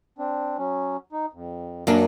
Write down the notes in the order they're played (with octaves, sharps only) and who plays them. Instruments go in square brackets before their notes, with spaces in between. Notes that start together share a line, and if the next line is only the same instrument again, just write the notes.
[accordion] C4 D4
F#3 C#4
D#4
F2
[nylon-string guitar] F#2 A#3 D4 [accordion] F#3